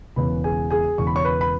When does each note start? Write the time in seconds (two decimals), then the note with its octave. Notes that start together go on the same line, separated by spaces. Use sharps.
0.16 E1 E2 C#3 B4 B5
0.44 G#4 G#5
0.71 G#4 G#5
0.98 E1 E2 C#3 C#6
1.07 B5
1.16 C#5 C#6
1.25 B4 B5
1.41 B5